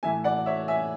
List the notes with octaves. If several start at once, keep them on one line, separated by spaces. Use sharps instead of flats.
A2 E3 E5 G#5
D5 F#5
C#5 E5
E5 G#5